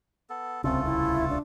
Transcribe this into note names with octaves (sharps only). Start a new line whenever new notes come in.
B3 A4
D1 C2 C#3 A3 C4 F4 A4
E4
D4